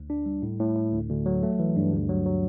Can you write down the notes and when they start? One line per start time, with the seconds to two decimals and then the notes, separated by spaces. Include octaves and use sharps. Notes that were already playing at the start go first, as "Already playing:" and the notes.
Already playing: D2
0.10 D4
0.26 G3
0.42 A2
0.59 A2
0.76 A2
0.93 D2
1.10 D2
1.26 F#3
1.43 A3
1.59 E3
1.76 G2
1.93 D2
2.09 F#3
2.26 F#3